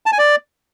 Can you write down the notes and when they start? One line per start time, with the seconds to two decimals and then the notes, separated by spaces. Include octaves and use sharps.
0.06 A5
0.12 G#5
0.18 D5